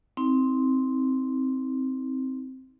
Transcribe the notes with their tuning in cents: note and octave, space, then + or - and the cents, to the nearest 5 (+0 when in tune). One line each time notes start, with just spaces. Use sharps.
C4 +0 D#4 +35